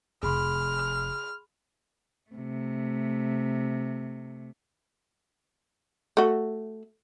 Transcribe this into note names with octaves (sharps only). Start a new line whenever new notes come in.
F1 G#4 B5 C6 F6
C3 A3
A3 F#4